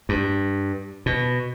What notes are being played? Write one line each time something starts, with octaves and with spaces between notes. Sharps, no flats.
G2
B2